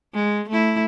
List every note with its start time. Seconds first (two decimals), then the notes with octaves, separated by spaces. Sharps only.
0.14 G#3
0.49 A3 E4